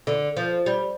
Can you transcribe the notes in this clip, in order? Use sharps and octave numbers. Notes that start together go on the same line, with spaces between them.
D3
F3
G3